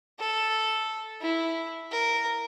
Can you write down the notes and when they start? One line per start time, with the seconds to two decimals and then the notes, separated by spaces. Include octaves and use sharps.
0.19 A4
1.21 E4
1.91 A#4